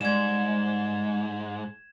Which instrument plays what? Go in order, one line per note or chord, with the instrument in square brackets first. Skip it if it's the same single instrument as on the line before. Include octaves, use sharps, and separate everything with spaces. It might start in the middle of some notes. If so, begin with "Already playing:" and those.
[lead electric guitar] G#2 [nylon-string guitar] G3 G#3 [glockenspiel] G#6 E7